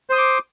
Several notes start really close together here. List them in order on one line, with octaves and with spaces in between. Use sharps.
C5 D#6 C6 D6